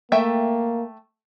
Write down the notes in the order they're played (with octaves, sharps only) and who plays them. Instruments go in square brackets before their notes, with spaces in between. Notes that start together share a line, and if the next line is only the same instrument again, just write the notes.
[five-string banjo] A3 E5 G5 [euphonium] A#3